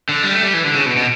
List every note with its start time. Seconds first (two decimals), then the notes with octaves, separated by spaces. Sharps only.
0.09 D3
0.23 G3
0.33 A3
0.43 G3
0.54 E3
0.64 D3
0.75 C#3
0.86 B2
0.96 B2